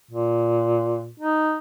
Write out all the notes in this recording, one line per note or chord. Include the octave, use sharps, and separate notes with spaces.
A#2
D#4